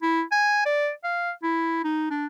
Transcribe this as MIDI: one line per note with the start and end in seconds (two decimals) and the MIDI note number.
0.02 0.22 64
0.32 0.62 80
0.66 0.90 74
1.04 1.31 77
1.43 1.82 64
1.84 2.05 63
2.11 2.26 62